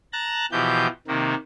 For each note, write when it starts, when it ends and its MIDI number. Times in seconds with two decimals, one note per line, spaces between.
0.13 0.46 81
0.13 0.46 82
0.13 0.46 90
0.13 0.46 93
0.52 0.87 47
0.52 0.87 52
0.52 0.87 53
0.52 0.87 67
0.52 0.87 91
1.08 1.35 48
1.08 1.35 51
1.08 1.35 58